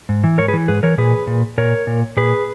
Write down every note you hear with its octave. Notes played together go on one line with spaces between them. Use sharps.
G#2
E3
G#2 A#4 C#5
G#4 B4
E3
G#2 G#4 B4
E3 A#4 C#5
A#2 G#4 B4
A#2
A#2 A#4 C#5
A#2
A#2 G#4 B4